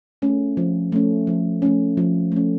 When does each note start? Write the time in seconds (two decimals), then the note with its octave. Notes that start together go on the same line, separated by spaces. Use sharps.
0.22 A3 C#4
0.57 F3
0.92 A3 C#4
1.27 F3
1.62 A3 C#4
1.97 F3
2.32 A3 C#4